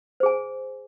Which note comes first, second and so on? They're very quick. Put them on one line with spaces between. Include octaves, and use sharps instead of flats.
C5 G#4 G#5